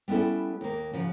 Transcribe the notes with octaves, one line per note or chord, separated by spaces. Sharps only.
G3 B3 C#4 E4 A4
D#2 A#3
C#3 F3 F#4